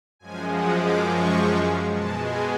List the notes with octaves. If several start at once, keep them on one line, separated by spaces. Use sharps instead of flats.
F#2 F3 G#3 G#5
F#5
D6
C#6
B2 G#3 A5
G#5